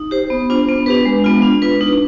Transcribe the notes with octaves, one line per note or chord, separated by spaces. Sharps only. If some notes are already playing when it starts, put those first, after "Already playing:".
Already playing: D#4
G4 C5
B3
D4 F4 C5
B3
D4 G4 B4
G#3
B3 F4
D4
F4 B4
D#4